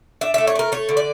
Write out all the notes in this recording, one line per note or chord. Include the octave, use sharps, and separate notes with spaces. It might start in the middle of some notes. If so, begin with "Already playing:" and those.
D4 E5
A3 E5
C#5
D4
A#4
A3 C#5
D3
D5